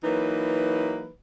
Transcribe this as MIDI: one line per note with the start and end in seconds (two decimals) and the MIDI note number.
0.04 1.10 52
0.04 1.10 54
0.04 1.10 58
0.04 1.10 63
0.04 1.10 71